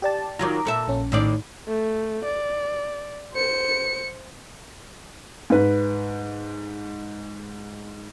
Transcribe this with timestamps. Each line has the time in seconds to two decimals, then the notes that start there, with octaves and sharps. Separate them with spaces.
0.02 G4 D5 A5
0.39 D#3 F#3 F4 A#5 D6
0.65 A#2 A4 E5
0.88 A#1 C#4
1.12 A2 D#3 D5
1.68 A3
2.25 D5
3.33 C5 C#7
5.50 G#2 B4